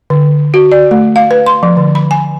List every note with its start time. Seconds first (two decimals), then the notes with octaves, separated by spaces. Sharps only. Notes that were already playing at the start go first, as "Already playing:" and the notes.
0.10 D3
0.54 F#4
0.72 D5
0.91 A3
1.16 F5
1.31 B4
1.46 C6
1.63 F3
1.77 D3
1.95 B5
2.11 G#5